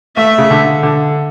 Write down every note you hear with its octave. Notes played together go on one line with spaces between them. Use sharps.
A3 E5
C#3
D3
D3